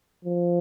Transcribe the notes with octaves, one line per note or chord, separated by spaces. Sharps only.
F3